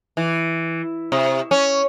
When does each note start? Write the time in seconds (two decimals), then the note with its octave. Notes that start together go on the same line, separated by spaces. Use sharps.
0.17 E3
1.12 C3
1.51 C#4